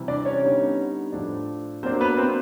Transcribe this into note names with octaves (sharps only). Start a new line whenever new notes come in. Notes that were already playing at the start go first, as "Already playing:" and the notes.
Already playing: C3 E3 G3
D4 D5
C#4 C#5
D3 G3 B3 D#4
A2 F3 A3 D4
F#3 A#3 C4 D4 C5
B3 B4
C4 C5